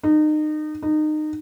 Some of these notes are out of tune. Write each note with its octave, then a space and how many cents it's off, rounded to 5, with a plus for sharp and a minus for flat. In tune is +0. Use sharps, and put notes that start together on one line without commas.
D#4 -30
D#4 -25